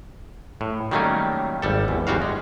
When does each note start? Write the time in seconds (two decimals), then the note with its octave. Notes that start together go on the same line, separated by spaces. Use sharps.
0.61 A2
0.91 D#3 F#3 G3 A3 A#3 C#4
1.62 G#1 G3 A4
1.88 E2
2.07 G1 E2 G3 F#4 F5
2.22 G#3